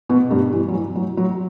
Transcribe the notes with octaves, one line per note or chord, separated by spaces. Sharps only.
B2 B3
G2 G3
E3
F#3
E3
F#3
F#3